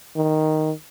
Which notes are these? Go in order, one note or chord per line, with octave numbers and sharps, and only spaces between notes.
D#3